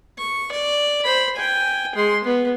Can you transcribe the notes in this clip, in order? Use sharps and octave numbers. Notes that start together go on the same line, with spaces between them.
C#6
D5
C5 B5
G5 G#5
G#3 C6
B3